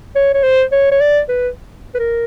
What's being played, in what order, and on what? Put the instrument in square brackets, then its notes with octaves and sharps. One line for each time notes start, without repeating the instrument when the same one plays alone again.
[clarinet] C#5
C#5
C5
C#5
C#5
D5
B4
B4
A#4